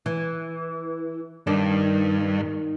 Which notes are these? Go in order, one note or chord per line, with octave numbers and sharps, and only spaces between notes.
E3
G2 D#3 D4